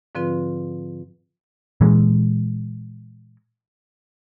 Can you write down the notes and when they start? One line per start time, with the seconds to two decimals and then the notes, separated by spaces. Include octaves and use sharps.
0.15 G#2 D3 F3 C4 F4 B4
1.81 A#2 E3 G#3